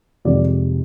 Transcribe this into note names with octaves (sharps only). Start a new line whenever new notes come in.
F2 C3 D#3 G#3 D5